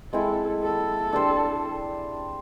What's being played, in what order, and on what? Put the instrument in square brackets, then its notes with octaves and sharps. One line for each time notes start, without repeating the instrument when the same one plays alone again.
[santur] G#3 C4 E4 [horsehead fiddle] A4
[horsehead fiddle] A4
[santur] D4 G4 C5